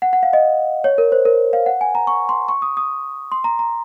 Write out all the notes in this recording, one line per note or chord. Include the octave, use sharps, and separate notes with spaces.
F#5
F#5
F5
D#5
C#5
A#4
C5
A#4
F5
F#5
G#5
A#5
C#6
C6
C#6
D#6
D#6
C6
A#5
A#5